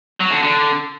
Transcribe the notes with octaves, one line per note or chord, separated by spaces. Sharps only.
F#3
D3
D3